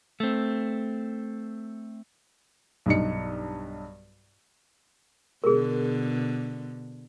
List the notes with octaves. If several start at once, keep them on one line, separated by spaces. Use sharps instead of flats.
A3 C4
B1 G2 D#4 C#7
B2 D3 G#4 A#4